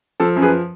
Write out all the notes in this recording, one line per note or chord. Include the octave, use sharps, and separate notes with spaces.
F3 A4
F#2
G#4 B4